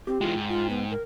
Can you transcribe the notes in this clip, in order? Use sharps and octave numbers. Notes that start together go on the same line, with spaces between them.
C4 G4
E3 G#3 F4 G5
G#2
F4
B3
A#4